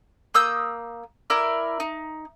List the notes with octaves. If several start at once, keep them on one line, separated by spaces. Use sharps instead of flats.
A#3 D#6 E6 G6
E4 A#4 D5
D#4